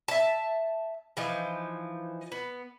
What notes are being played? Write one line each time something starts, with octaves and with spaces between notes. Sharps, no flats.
E5 A5
E3 F3 D#4
B3